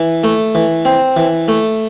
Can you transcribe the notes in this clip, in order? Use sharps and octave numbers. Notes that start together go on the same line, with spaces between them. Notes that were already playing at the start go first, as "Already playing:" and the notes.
Already playing: E3
A3
E3
C4
E3
A3